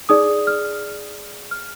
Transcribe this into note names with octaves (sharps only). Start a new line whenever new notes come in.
D#4 G#4 D5 D#6
F6
F6